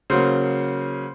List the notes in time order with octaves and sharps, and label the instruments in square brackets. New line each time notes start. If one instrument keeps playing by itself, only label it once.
[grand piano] C#3 F#3 A#3 C5